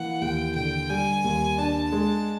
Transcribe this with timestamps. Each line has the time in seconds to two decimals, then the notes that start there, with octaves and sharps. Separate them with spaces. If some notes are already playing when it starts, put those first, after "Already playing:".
Already playing: E3 A#3 F#5
0.21 D#2 G5
0.55 D3 G5
0.90 G3 G#5
1.24 D#2
1.58 D4 A5
1.92 G#3